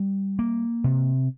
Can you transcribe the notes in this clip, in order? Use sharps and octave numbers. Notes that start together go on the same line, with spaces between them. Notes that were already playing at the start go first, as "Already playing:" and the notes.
Already playing: G3
A#3
C3